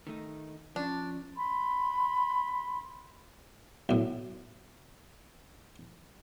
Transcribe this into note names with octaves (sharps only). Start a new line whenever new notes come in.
D#3 A3 D#4
F3 C#4 D4
B5 C6
B1 A2